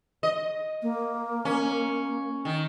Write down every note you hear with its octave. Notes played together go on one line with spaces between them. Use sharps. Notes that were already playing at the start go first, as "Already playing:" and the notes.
D#5
A#3
C#4
D#3